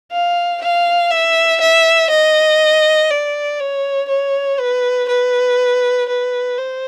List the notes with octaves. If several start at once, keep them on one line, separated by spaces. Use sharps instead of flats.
F5
F5
E5
E5
D#5
D5
C#5
C#5
B4
B4
B4
C5